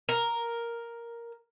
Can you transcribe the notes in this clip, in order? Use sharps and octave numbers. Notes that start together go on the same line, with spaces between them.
A#4